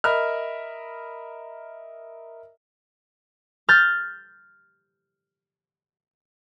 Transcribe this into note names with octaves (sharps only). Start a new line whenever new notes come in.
A#4 D#5 E5 B5 F6
F6 G6 A6